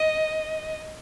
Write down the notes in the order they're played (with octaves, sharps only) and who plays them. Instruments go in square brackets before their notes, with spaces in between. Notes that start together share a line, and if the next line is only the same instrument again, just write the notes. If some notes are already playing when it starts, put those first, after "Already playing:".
Already playing: [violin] D#5